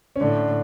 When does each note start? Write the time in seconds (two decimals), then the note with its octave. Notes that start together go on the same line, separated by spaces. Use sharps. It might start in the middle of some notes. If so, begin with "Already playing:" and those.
0.16 C#4
0.20 A2 D3 D4